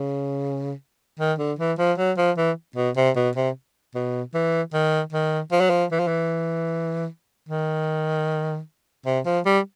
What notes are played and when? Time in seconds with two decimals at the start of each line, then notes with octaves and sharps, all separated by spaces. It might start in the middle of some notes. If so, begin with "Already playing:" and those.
Already playing: C#3
1.20 D#3
1.39 D3
1.59 E3
1.78 F3
1.98 F#3
2.17 F3
2.37 E3
2.76 B2
2.96 C3
3.16 B2
3.35 C3
3.95 B2
4.34 E3
4.73 D#3
5.13 D#3
5.52 F3
5.61 F#3
5.70 F3
5.91 E3
5.99 F3
6.07 E3
7.49 D#3
9.06 C3
9.26 F3
9.46 G3